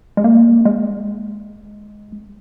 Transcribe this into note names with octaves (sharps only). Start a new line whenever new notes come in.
G#3
A#3
G#3